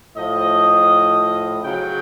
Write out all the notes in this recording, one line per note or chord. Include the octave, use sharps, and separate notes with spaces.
A2 F3 D#5
C#3 F#3 G5